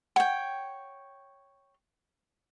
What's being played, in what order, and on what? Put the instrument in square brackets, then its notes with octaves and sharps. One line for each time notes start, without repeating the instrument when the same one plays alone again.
[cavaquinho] C#5 G5 [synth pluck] F#5